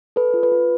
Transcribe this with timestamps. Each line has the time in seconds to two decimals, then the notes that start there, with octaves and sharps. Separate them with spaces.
0.16 A4 B4
0.34 F4
0.43 B4
0.52 F4